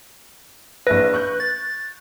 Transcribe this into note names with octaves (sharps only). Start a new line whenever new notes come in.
A#1 E4 B4 A#6
C#6 F#6 G6
A6